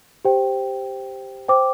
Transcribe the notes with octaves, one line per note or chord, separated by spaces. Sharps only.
G4 C5 G5
C5 G5 D6